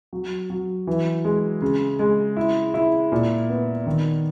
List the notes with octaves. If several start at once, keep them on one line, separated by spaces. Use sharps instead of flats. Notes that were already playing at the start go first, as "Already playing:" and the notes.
F#3
F#3
E3
G#3
C#3
G#3
E4
E4
A#2
B3
D#3